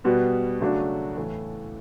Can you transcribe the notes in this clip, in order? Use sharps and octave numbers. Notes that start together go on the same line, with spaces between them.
B2 G3 B3 F#4
C#3 F#3 A3 D4 F#4
A2 E3 A3